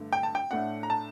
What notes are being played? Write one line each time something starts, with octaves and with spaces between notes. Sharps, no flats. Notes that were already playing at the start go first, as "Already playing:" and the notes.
Already playing: G2 D3 A3
G5
A5
G5
A2 A3 D4 F#5
A#5
A5